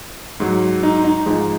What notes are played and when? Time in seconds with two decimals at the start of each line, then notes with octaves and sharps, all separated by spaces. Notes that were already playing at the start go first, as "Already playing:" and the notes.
0.40 G#2 F#3
0.83 D#4
1.04 D#4
1.26 G#2 F3 G#3 D#4